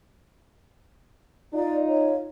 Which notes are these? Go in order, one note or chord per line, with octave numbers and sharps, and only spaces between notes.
D#4 F4 D5
C#5